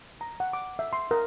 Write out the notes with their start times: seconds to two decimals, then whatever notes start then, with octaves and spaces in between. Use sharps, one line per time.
0.21 A#5
0.40 F#5
0.53 D6
0.79 E5
0.93 C6
1.11 A#4